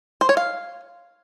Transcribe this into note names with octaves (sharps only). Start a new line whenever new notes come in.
C5
C#5
F5